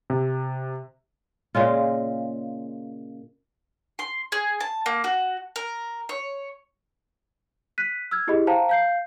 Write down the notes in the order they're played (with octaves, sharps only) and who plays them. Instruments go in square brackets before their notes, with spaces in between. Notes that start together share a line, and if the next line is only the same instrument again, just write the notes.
[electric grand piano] C3
[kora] A#2 C#3 G#3 F4
[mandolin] C6
G#4
A5
A#3
F#4
A#4
C#5
[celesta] F#6 B6 D#7
E6 F6 G#6
E4 G4 G#4 D#5 B5
C5 F5 G5 A5 A#5
F5 G6 C7